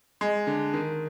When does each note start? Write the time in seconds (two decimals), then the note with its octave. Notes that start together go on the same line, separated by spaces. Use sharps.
0.21 G#3
0.47 D3
0.74 D#3